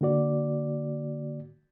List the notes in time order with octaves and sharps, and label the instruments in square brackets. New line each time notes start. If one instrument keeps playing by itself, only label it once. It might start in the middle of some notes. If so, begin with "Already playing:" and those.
[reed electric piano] D3 A#3 F#4 D5